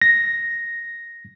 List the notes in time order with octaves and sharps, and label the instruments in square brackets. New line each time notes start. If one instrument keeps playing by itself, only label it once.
[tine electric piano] A#6